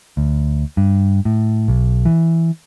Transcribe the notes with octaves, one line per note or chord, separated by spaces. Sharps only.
D2
G2
A2
B1
E3